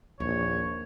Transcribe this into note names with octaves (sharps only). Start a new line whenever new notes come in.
A#1 D#2 C#5